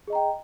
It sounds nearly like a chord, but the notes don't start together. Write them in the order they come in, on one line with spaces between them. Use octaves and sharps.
G#4 D#5 A#5 G5